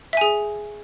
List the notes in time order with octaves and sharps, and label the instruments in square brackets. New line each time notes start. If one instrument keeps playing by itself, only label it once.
[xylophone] E5
G#5
G#4